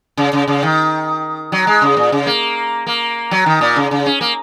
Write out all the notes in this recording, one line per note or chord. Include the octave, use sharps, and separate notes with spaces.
C#3
C#3
C#3
D#3
F#3
G#3
C#3
A#2
C#3
A#3
A#3
F#3
D#3
A#2
C#3
C#3
C#4
A#3